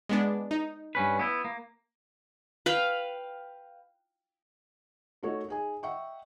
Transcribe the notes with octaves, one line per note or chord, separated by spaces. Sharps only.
G#3 B3 D4
D#4
G2 C#4 B4
B3 E4
A#3
B4 F5 G5
A3 A#3 D#4 F#4 C#5
D#4 G#4 G#5
D#5 E5 F#5 G5 C#6